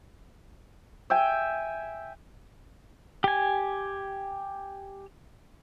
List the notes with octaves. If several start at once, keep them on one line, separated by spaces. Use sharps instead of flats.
E5 G5 G#5
G4 G#5